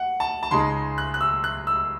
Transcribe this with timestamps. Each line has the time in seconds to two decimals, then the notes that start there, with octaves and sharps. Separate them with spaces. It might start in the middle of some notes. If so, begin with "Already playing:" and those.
Already playing: F#5
0.20 A5
0.43 A5
0.51 C#2 C#3 G#3 D#4 C6
0.98 F#6
1.14 F#6
1.21 E6
1.44 F#6
1.67 E6